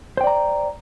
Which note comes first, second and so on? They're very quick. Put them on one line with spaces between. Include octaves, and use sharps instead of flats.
C5 G5 D5 A#5